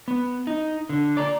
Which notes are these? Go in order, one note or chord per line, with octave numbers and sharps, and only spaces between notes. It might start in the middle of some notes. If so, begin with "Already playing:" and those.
B3
D#4
D3
D5 A#5